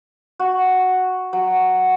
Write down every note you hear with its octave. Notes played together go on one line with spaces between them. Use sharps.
F#4
F#3